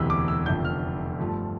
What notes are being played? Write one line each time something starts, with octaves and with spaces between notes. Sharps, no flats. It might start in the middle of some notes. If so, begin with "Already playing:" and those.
Already playing: E1 D2 C3 E3 E6
D6
E6
F1 F2 D3 G6
F6
G2 F3 A3